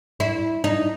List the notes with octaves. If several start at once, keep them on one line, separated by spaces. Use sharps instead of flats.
E4
D#4